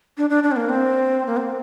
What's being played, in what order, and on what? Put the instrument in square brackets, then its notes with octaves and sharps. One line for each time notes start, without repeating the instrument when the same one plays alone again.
[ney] D4
D4
D4
C4
A#3
C4
A#3
C4